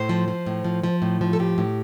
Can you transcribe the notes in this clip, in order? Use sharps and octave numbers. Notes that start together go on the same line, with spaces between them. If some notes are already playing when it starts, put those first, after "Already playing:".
Already playing: A2 C5
F3
F3
A2
F3
F3
A2
F3
A4
A2 G4
A2